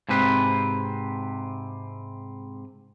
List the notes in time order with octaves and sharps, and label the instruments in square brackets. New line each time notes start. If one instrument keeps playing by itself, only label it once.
[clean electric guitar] G#2 C3 C4 B4